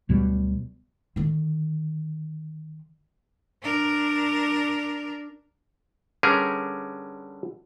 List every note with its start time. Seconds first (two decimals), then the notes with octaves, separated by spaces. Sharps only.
0.09 D2 B2 F#3 G3
1.16 D3 D#3
3.62 D4 A#4
6.23 D3 G3 C#4 G#4 A#4 B4